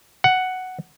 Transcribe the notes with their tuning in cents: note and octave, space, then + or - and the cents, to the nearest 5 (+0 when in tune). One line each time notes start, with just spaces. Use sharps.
F#5 +5